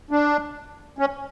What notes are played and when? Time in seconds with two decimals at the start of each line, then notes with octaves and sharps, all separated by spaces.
0.11 D4
0.99 C#4